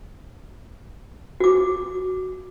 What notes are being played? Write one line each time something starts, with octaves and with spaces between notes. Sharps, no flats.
F#4 D6